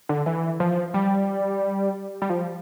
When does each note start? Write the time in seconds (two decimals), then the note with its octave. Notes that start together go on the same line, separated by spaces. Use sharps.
0.09 D3
0.26 E3
0.60 F3
0.94 G3
2.22 G3
2.30 F3